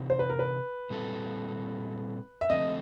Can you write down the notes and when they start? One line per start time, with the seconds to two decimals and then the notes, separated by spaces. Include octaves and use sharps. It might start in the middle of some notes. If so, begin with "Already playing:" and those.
Already playing: C3 E3 C4 D#4
0.10 C5
0.19 B4
0.29 A#4
0.39 B4
0.90 A#2 G3 C4 E4 A4
2.41 E5
2.50 D3 F3 A3 C4 D#5